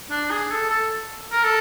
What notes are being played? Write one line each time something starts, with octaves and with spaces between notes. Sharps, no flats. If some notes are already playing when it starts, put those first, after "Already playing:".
D4
G#4
A4
A4
A#4
A4